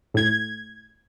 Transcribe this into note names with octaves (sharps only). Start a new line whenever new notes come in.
A2 G#6